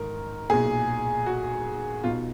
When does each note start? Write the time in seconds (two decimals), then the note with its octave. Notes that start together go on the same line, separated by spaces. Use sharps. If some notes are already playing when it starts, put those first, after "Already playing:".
Already playing: G#2 D#3 A#4
0.50 B1 A#2 G#4
1.26 F#4
2.04 B1 B2 F4